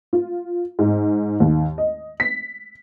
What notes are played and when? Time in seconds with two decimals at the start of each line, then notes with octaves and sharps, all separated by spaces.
0.13 F4
0.79 G#2
1.40 D#2
1.78 D#5
2.20 B6